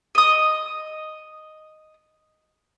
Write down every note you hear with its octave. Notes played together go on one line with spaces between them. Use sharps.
D#5 D#6